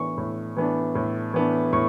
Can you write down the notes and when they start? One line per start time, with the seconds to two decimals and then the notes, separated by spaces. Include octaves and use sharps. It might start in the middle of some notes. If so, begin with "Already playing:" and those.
Already playing: A2 E3 B3 D4 C#6
0.18 A2
0.56 E3 B3 D4
0.95 A2
1.34 E3 B3 D4
1.73 A2 C#6